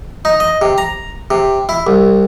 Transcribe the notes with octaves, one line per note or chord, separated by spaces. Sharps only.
D#4
D#5
C3
A#5
C3
E4
C2